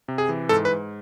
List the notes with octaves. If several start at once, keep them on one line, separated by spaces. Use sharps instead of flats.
C3
G#4
E3
G#2 A4
B4
G#2